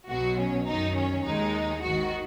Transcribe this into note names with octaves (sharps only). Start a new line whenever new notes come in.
B1 B2 F#3 F#4
C#4
F#2 D#3 F#3 D#4
C#4
D#2 D#3 G#3 D#4
G#1 G#2 D#3 F#4